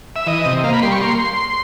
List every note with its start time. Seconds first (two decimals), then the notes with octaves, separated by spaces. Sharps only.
0.16 E5
0.26 E3 D#5
0.46 C3
0.64 A#3 F5
0.74 B5
0.82 G3 C6
0.92 C#6
1.00 A#3 C6